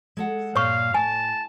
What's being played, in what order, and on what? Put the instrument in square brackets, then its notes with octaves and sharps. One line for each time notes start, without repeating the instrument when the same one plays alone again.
[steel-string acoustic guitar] G#3 A4 F#5
[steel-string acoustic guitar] G2 A#2 [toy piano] C#5 C#6 [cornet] F5
[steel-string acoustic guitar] A2 [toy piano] G#5 [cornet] A5